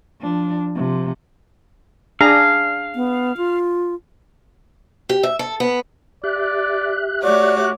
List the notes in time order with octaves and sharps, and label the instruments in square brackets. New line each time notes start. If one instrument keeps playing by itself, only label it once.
[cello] F3 D4
C3 F3
[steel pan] D4 G#4 A#5 [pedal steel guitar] F5
[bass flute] B3
F4
[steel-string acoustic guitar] G4
E5
A4
B3
[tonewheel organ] G4 E5 F#6 [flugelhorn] D5
[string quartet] A3 C#5 D6 [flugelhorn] F#4 [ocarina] D5